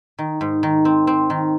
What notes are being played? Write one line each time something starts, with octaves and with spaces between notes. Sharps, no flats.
D#3
G#2
D#3
C4
C4
D#3